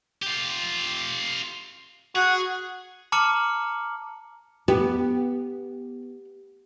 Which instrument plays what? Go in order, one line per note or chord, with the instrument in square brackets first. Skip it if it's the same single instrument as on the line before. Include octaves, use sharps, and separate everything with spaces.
[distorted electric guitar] F4 G4
[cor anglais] F#4 [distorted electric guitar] G#4
[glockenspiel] A5 A#5 D6 F6 C#7 F#7
[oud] B3 [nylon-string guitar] G4